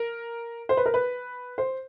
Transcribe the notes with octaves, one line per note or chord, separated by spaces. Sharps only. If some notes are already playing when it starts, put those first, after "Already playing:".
Already playing: A#4
C5
B4
A#4
B4
C5